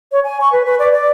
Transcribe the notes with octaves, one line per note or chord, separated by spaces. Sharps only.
C#5
G#5
C#6
B4
B4
D5
D5